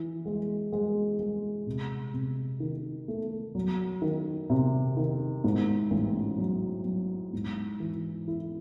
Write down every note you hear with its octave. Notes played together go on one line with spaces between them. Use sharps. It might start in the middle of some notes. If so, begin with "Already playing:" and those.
Already playing: E3
G#3
G#3
G#3
C3
C3
D#3
A3
F#3
D#3
C3
D#3
G#2
A1
F#3
F#3
G#2
E3
E4